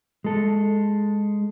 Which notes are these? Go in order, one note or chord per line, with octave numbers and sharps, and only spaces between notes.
G#3 A4